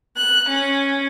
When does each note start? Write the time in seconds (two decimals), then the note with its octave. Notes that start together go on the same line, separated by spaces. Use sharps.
0.14 F#6
0.46 C#4